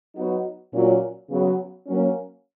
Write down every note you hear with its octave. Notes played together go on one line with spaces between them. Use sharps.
F#3 B3 D#4 F#4
A#2 F#3 C#4
C#3 F#3 B3
F#3 A#3 C#4